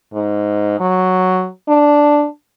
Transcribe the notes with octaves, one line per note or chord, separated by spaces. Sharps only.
G#2
F#3
D4